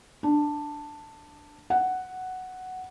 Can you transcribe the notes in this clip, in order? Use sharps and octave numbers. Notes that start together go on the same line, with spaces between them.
D4
F#5